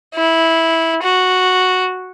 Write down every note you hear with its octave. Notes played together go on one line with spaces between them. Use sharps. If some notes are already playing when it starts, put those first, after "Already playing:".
E4
F#4